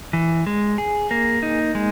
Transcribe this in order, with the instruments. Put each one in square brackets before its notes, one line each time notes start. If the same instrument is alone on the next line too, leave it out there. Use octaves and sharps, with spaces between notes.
[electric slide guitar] E3
G#3
G#4
A#3
D#4
G#3